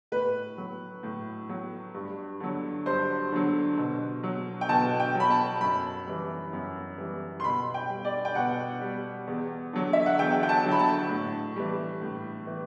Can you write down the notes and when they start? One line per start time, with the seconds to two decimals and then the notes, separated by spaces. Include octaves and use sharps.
0.12 A2 B4
0.58 F#3
1.03 A2
1.49 F#3
1.94 G2
2.40 D3 F#3
2.86 G2 C5
3.32 D3 F#3
3.78 B2
4.23 F#3
4.61 G5
4.69 B2 A5
5.00 G5
5.15 F#3 B5
5.30 A5
5.61 F#2 B5
6.07 E3 G3
6.53 F#2
6.98 E3 G3
7.40 C6
7.44 B2 B5
7.74 G5
7.90 G3
8.05 D5
8.25 G5
8.35 B2 F#5
8.81 G3
9.27 E2
9.73 D3 F#3
9.93 E5
10.06 F#5
10.19 E2 G5
10.43 G5
10.49 A5
10.65 D3 F#3
10.71 B5
10.79 A5
11.10 A2
11.56 E3 G3
12.01 A2
12.47 E3